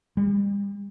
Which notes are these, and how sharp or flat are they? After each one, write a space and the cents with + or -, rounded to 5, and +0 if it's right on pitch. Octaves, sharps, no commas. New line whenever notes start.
G3 +40